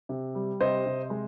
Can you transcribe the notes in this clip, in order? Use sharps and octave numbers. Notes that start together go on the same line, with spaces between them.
C3
G3
C3 C5 D#5
C3
G#3